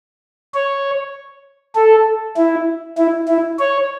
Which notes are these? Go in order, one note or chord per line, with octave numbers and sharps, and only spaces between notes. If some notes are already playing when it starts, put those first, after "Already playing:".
C#5
A4
E4
E4
E4
C#5